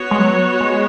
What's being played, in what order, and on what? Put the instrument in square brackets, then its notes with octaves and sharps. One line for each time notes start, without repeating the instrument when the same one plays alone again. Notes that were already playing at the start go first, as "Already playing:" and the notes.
Already playing: [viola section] B3 F#4 C#5
[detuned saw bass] G#3
F#3
G#3